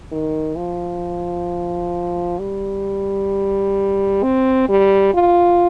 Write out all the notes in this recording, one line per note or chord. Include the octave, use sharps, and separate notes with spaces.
D#3
F3
G3
C4
G3
F4